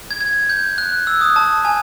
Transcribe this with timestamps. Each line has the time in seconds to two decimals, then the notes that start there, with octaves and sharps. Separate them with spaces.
0.11 G#6
0.21 G#6
0.50 G6
0.78 F#6
1.07 E6
1.21 D#6
1.36 A5
1.65 G#5